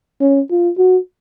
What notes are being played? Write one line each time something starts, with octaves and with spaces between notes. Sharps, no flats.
C#4
F4
F#4